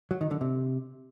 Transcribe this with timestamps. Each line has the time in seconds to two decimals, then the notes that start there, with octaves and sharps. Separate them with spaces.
0.11 F#3
0.21 D#3
0.31 D3
0.41 C3